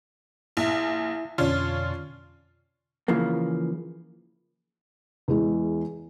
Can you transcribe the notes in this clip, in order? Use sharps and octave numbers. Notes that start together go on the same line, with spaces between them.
A#1 E4 E5
F2 B2 D3 C#4 D4 F4
C#3 E3 F3 A#3
E2 G#3 E4